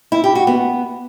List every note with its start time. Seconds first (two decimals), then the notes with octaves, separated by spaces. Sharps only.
0.12 E4
0.24 G4
0.35 F#4
0.47 B3